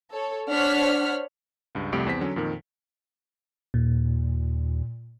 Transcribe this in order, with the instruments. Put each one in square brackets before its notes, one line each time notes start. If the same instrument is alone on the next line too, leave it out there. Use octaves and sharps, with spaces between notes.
[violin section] A4 C#5
D4 C5 C#5 F#5 F6 B6
[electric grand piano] C#2 G2
C2 F2 G3 A3 G4 D7
E2 C4 B6
D3 F#3 C#4
F2 A#2 D#3
[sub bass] D#2 [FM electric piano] A#2